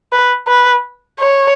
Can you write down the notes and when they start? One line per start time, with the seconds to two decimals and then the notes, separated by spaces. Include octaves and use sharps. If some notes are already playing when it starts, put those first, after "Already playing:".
0.12 B4
0.48 B4
1.20 C#5